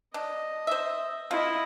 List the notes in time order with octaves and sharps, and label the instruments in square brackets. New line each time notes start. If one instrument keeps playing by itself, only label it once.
[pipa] D4 [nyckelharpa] D#5
[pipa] C5 E5
[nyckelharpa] E4 D#5 [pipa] F4